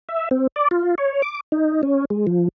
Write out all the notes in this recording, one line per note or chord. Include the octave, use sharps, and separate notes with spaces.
E5
C4
D5
F4
C#5
D6
D#4
C#4
G#3
F3